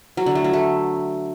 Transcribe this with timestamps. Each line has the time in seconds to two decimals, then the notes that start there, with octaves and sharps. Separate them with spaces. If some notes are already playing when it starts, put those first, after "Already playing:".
0.17 F#3
0.26 D3
0.35 A3
0.44 F#3
0.53 A3